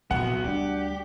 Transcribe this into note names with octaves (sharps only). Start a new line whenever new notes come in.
A#1 C3 E3 F#3 B3 F#5
D2 G3 D4 G4